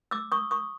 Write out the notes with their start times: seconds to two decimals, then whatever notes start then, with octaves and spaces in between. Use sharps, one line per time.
0.11 D6 E6
0.32 C#6 D#6
0.51 C#6 D#6